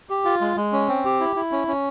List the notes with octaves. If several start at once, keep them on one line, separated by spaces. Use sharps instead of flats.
G4
F4
G#3
G#3
C#4
C4
G4
E4
E4
C#4
C#4